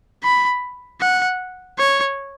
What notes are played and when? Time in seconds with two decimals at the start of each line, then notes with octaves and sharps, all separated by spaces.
0.24 B5
1.01 F#5
1.78 C#5